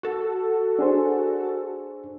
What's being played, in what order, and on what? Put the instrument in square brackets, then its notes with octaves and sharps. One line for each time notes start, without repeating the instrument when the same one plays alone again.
[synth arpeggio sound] F#4 A4
[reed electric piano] D4 G#4 C5